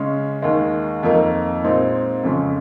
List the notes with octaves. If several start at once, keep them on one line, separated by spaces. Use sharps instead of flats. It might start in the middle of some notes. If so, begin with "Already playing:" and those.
Already playing: C#3 G#3 C#4
D#2 D#3 G#3
F2 D#3 A#3 D#4
A#2 G#3 C4 D#4
F2 C#3 G#3 C#4